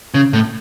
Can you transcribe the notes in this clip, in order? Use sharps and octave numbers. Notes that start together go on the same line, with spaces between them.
C#3
A2